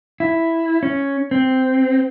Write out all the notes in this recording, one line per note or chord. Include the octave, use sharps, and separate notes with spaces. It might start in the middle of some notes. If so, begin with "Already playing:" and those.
E4
C#4
C4